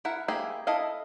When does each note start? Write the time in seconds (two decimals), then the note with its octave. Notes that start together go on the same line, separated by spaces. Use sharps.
0.05 E4 A#4 F#5
0.28 A#3 C4 E4 G4 G#4
0.67 E4 A4 D#5 F5